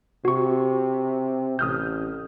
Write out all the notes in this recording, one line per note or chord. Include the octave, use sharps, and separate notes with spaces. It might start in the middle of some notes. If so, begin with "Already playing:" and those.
C3 F#4 C#6
A1 D#6 F6 G6